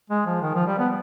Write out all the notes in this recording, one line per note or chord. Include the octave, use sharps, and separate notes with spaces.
G#3
F3
D#3
F3
G3
B3